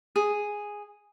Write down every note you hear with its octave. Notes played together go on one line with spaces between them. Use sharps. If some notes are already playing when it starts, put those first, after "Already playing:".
G#4